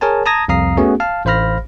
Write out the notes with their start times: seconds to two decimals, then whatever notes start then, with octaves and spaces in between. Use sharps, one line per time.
0.01 G#4 A#4 C#5 G#5 A5
0.26 A5 A#5 D#6 G#6 A#6
0.48 C2 F2 F5 A#5 D#6 C7
0.77 A3 B3 C#4 F#4 G#4
1.00 F5 A5 F6
1.25 A1 C5 F5 B5 F6 A#6